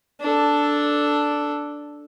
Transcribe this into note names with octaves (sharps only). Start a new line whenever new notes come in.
D4 A4